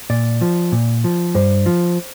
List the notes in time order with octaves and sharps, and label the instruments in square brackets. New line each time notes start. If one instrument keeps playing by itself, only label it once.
[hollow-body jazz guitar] A#2 D5
F3
A#2
F3
G2 C5
F3